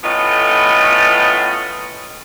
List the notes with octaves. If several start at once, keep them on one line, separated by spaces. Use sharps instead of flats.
A2 A3 B3 C#4 F4 D#5